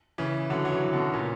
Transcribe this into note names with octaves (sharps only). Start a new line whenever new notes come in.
C#3 E3
D3 F#3
F#3
C#3 E3
B2 D3
A#2 C#3